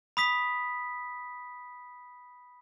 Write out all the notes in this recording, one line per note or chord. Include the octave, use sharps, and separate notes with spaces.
B5 D#6 B6